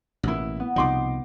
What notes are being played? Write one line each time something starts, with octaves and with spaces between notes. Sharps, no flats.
A1 B2 A#3 E4
B3
C2 B2 F3 D#4 C6 D6